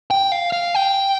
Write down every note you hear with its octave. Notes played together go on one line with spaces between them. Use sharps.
G5
F5
F5
G5